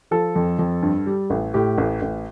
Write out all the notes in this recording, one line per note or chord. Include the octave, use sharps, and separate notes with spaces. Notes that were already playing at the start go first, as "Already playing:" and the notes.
F3 A4
F2
F2
G2
G3
A1
A2 G4
A1
A1